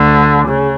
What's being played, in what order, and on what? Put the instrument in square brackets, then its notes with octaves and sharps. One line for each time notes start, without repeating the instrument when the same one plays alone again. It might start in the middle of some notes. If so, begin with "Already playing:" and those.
Already playing: [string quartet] D2 D3
C#3